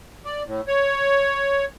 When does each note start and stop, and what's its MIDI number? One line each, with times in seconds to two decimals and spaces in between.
0.25 0.43 74
0.46 0.61 45
0.68 1.65 73